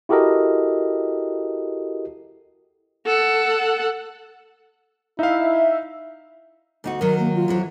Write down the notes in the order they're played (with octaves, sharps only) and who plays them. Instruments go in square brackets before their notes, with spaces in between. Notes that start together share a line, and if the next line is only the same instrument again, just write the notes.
[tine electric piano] E4 F#4 G4 A4 A#4 D#5
[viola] A4 F#5
[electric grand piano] D#4 F5 [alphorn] E4 [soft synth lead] E5
[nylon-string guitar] D2 D#4 F#4
[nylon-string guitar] D#3 F#3 [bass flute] A#4
[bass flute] A#3
F4
[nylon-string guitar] F2 E3 F#3